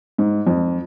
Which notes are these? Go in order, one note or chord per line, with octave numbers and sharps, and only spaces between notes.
G#2
F2